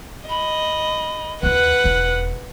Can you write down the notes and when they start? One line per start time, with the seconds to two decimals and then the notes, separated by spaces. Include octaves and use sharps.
0.29 D#5 B5
1.43 D#2 F4 B4 F#5 F#6
1.84 E1 E4